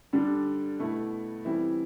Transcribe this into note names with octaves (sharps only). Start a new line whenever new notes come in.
D3 G3 D4
B2 A3 E4
E3 G3 C4 E4